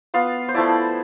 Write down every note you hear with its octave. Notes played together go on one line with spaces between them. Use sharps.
B3 F4 F5
C5
F3 A3 E4 D5